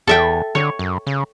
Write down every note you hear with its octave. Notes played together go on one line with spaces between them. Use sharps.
E2 A4 E5 G5
D3 C#5
F#2
C#3